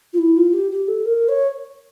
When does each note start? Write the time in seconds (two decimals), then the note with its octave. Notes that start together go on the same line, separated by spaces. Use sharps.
0.13 F4
0.18 E4
0.36 F4
0.53 G4
0.71 G4
0.88 A4
1.05 A#4
1.29 C#5